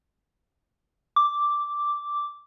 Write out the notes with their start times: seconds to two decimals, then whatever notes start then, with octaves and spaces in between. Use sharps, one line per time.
1.16 D6